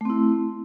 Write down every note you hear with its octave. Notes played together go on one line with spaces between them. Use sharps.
A3 C4 E4